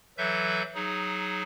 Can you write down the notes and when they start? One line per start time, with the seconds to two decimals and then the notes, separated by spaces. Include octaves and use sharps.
0.18 E3 F#3 A4 B4 E5 G6
0.75 F#3 D#4 G#4